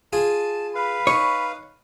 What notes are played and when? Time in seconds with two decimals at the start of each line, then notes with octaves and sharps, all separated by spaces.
0.13 F4 G#4 G#5 A5
0.75 B4 F5 B5
1.07 D#4 C#5